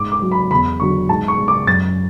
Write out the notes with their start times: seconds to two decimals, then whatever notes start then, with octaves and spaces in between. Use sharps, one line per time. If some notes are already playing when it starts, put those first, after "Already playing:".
Already playing: G#2 D6
0.12 D6
0.22 F#3
0.32 B5
0.51 E2 B5
0.80 D3 F#3 C#6
1.09 G#2 A5
1.28 C#6
1.38 G#3
1.48 D6
1.67 F#2 A6